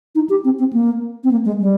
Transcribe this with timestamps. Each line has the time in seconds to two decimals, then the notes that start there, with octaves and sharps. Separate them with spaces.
0.15 D#4
0.29 G4
0.44 C4
0.59 C4
0.73 A#3
1.24 C4
1.31 A#3
1.45 G#3
1.60 G3